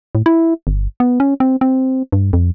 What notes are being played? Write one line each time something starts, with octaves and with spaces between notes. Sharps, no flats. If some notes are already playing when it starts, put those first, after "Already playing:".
A2
E4
G1
B3
C#4
C4
C4
G2
F2